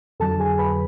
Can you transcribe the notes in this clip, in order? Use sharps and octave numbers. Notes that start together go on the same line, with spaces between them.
F2 D3 F#3 A4 A5
G#4 G#5
B4 B5